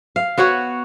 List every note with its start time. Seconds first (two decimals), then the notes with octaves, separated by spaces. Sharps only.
0.16 F5
0.38 B3 F#4 C#5 F#5